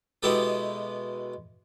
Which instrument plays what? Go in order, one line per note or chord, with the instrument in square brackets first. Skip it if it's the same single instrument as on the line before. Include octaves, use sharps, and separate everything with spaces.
[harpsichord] B2 G#3 B3 E4 G4 A4